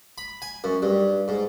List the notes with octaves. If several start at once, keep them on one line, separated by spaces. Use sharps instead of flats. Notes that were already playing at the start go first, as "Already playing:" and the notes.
B5
G#5
F#2
G2
G#2